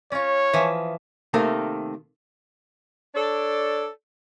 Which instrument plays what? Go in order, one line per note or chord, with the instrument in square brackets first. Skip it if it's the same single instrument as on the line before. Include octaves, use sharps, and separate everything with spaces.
[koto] C#4 F4 [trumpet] C#5
[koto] E3 F3
[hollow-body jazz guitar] C3 D#3 A3 A#3
[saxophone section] D4 A4 C#5 D5